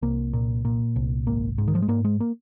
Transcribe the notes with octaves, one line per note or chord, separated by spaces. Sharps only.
C2 A#3
A#2
A#2
C2
G#1 A#3
G#2
D#3
F3
G#3
G#2 A#3
G#3
A#3